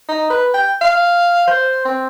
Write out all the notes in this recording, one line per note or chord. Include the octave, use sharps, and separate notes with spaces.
D#4
B4
G5
F5
C5
C4